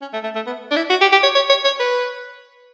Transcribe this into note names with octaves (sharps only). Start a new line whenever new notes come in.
C#4
A3
A3
A3
B3
D4
E4
F#4
G4
G4
C#5
C#5
C#5
C#5
B4